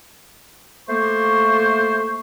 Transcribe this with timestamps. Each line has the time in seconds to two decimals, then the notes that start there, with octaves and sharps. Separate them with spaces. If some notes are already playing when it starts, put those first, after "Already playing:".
0.89 A3 A#3 C5 C#6